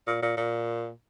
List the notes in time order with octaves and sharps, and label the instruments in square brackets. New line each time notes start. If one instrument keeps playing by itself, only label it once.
[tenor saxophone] A#2
A#2
A#2